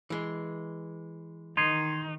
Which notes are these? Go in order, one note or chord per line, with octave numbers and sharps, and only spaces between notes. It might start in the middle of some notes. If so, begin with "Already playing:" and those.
E3 G#3
D#3 D#4 C6 G#6 C7